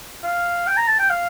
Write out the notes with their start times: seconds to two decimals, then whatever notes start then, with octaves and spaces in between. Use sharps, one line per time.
0.24 F5
0.67 G5
0.77 A#5
0.87 A5
0.99 G5
1.10 F5